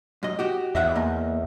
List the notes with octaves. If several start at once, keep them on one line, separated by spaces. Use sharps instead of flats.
F#2 D#5
F#4 G4
E2 D#5 E5 F#5
A#3 D#5